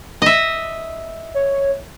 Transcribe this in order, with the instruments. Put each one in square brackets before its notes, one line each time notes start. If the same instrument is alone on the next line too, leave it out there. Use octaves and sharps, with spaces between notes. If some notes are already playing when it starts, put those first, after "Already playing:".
[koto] D#5 E5
[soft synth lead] C#5